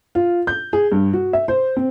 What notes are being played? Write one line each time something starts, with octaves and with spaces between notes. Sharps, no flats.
F4
G6
G#4
G2
F#4
E5
C5
C4